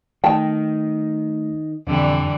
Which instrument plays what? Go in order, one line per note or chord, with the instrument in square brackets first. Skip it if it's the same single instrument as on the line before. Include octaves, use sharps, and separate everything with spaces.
[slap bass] D#3 [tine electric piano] A3 [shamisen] G5 A5
[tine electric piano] F2 B2 [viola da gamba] D3 E3 G3